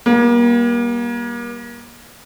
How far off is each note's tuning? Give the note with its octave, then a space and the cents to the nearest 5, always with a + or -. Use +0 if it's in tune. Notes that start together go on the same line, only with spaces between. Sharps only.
G3 +0 A#3 +35